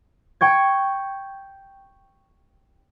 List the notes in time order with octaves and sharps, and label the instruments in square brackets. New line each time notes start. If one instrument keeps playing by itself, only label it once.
[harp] G5 C#6 G#6